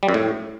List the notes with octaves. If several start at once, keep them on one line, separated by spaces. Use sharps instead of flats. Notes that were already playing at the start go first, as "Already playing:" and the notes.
G3
F#2
A2